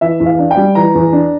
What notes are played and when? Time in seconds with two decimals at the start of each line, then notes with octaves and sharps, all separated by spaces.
0.01 E3 E5
0.20 E2
0.26 F5
0.39 D4
0.51 G5
0.57 G3
0.75 E3 A#5
0.95 E2
1.12 D4